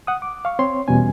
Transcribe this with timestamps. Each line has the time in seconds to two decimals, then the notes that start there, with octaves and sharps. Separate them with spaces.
0.07 F#5 D#6
0.22 D6
0.45 F5 C#6
0.59 C4 C#5 C6
0.88 E2 B2 G3 C#4 G#5